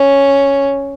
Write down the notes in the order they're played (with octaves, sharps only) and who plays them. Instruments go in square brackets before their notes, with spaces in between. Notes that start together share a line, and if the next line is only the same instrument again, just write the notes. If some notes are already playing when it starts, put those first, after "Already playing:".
Already playing: [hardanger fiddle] C#4